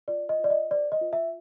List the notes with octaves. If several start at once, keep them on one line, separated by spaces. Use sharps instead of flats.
F4 D5
D#5
F4 D5
D#5
C5 D5
D#5
F4
E5